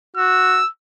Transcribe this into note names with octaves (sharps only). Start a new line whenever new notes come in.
F#4 E6